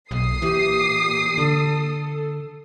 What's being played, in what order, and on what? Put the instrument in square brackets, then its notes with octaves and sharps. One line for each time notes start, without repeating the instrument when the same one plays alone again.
[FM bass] B1 [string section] A#2 D#6 C7
[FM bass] E3 [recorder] G4
[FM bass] D3 [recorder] A4